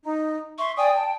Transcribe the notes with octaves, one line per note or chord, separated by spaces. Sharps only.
D#4
E5 C6 C#6
D5 G5 G#5 D#6
A5